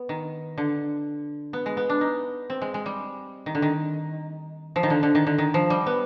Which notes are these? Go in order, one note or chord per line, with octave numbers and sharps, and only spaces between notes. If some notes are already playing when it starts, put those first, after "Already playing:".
Already playing: B3
D#3
D3
B3
G#3
B3
D4
D#4
C4
G#3
G#3
G3
D#3
D3
D#3
F3
D#3
D3
D3
D#3
D3
D#3
F3
G3
B3